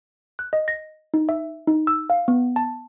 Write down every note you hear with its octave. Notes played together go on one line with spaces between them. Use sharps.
F#6
D#5
A#6
D#4
E5
D#4
E6
F5
B3
A5